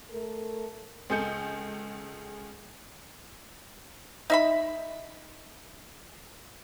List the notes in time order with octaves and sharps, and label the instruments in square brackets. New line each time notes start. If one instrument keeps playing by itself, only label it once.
[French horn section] A3 A4 A#4
[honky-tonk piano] C#2 G#4 A4 G6 C#7
[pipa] D#4 E5 B5